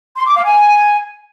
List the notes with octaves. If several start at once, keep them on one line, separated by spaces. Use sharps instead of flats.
C6
D6
F5
G#5